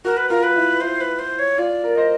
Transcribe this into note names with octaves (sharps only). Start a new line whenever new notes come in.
F#4 A#4
B4
F4 A#4
B4
E4
E4 C5
B4
C5
C#5
F4 D5
A#4
C5 D#5